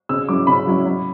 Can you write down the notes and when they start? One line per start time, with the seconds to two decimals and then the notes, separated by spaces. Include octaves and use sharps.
0.09 C#3 E6
0.28 F#3 C#4 E4 D6
0.47 C#3 B5
0.67 F#3 C#4 E4
0.85 F#3